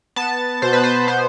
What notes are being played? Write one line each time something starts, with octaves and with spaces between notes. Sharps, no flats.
B3 A5
B2 C5
B4
C5
B3 C5